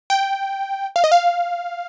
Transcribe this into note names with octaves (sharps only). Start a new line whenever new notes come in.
G5
F5
D#5
F5